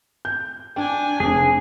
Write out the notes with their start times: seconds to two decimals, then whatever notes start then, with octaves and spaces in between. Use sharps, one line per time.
0.25 G6
0.76 D4 G5 G#5
1.20 F1 G#4